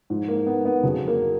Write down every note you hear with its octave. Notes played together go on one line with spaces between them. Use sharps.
G#2 F3
A#3
B3
B3
F2 C#3 F#3
A#3